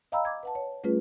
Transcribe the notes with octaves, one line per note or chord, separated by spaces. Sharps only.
D#5 F5 G5 A#5 B5 E6
D6 G#6
B4 F#5 A5
C#5
G3 A3 C#4 F4 G#4 B4